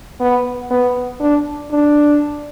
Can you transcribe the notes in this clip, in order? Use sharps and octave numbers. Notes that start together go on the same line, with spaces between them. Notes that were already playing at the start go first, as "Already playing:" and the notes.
B3
B3
D4
D4